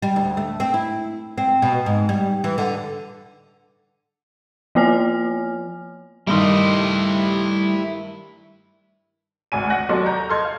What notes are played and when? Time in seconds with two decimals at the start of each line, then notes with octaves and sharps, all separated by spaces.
0.02 G3
0.16 D2
0.37 A3
0.60 C4
0.74 E4
1.38 C4
1.62 B2
1.86 G#2
2.09 G3
2.44 E3
2.58 D3
4.75 F3 A#3 F4 C#5 G#5 F6
6.27 G2 D#3 G3 A3 E4 C5 D#5
9.52 G#1 D2 G#5 D#7
9.70 F#5 F#6 A#6
9.89 D#2 F#3 A4 D5 C6
10.06 A#5 G6
10.29 A4 D#5 C6 F6 G#6
10.44 F5